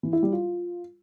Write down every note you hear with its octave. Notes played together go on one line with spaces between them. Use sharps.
E3
E4
G3
F4